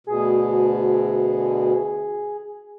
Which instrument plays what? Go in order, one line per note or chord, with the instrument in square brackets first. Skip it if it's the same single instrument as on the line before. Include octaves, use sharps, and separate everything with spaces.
[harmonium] D2 B2 [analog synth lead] G#4